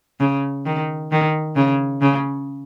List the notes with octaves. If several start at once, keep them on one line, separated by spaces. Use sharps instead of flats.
C#3
D#3
D#3
C#3
C#3